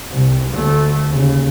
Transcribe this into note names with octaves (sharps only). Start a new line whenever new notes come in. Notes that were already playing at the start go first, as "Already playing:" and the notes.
C2
D2 A3
D#2 C#3